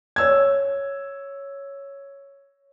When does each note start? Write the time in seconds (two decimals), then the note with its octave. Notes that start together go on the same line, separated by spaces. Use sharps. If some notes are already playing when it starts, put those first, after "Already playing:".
0.16 C#5 E6 G#6